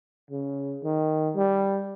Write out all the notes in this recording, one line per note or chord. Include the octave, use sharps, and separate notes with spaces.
C#3
D#3
G3